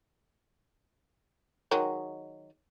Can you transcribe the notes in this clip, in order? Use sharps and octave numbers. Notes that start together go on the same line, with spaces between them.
D#3 F#3 G#3